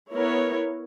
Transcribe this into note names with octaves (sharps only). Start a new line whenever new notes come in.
B3 E4 A#4 C#5